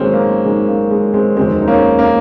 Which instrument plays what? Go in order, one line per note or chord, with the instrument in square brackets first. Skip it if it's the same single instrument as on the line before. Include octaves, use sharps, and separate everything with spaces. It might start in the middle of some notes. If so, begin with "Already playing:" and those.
Already playing: [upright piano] G#1 G#2 D#3 F#3 G#3 A#3 C4 C#4
A#3
G#1 G#2 D#3 F#3 G#3
A#3
G#3
G#3 C4
F1 D#2 D#3 F#3 G#3 C4
D#4
A#3 C#4
A#3